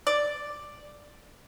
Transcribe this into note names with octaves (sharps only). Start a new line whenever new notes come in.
D5